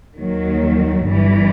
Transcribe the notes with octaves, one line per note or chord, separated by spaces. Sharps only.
D#2 D#3 F#3
G1 G2 E3